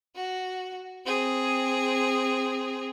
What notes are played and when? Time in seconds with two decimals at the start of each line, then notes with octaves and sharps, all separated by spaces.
0.15 F#4
1.05 C4 G#4